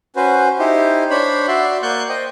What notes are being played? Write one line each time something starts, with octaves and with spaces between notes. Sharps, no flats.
C#4 F#4 B4 C5
D#4 E4 G4 C5
D4 C5 C#5 B5
F#4 D5 E5 C6
A#3 D5 C#6 F#6 G6
C5 D#5 G5